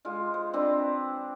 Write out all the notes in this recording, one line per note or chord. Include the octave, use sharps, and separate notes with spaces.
G#3 F4
C5
C4 D4 B4 A#5